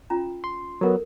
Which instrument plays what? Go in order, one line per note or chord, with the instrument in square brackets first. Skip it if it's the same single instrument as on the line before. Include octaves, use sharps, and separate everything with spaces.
[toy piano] C#4 F4 A#5
[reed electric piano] C6
[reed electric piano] F#3 B3 [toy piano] A4 A#4